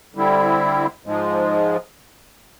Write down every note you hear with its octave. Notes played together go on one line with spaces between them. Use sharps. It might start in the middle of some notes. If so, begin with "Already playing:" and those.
D3 G3 C4 E4
G#2 F3 G#3